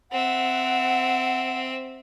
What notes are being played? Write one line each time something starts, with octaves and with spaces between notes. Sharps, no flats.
C4 E5 F#5